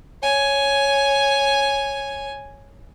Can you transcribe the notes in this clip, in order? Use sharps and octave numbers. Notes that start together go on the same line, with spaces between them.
C#5 G#5